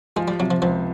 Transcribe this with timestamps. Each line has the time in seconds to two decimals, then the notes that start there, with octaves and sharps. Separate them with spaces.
0.16 F3 G#3
0.28 G3
0.39 C3 F#3
0.51 F3
0.62 C#2 F3